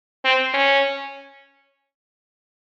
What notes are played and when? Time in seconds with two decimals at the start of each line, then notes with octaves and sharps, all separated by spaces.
0.25 C4
0.53 C#4